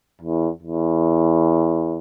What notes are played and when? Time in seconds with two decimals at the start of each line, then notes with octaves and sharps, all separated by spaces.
0.21 E2
0.62 E2